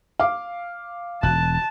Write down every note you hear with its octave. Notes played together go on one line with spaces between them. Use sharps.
F5 D6
E1 A5 F#6